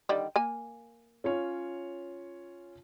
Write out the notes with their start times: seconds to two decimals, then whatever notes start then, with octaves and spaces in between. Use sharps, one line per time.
0.09 D3 D#3 G3
0.36 A#3 G#5
1.24 C#4 F4 C#5